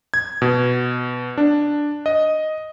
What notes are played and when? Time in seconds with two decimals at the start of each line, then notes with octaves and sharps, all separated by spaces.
0.14 G#6
0.42 B2
1.38 D4
2.06 D#5